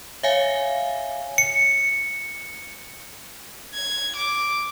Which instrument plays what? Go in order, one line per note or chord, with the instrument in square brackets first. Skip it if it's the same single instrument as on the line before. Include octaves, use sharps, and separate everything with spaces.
[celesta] C#5 [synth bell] E5 F5 G#5
[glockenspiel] C#7
[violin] G#6
D6